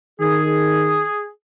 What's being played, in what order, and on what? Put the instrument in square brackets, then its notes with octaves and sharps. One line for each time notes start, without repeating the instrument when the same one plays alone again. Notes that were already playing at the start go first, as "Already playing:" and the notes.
[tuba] D#3 [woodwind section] G#4